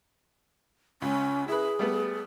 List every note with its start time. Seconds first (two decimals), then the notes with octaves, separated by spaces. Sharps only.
1.02 C#2 C#4
1.48 E4 G#4 B4
1.79 G3 A3 B3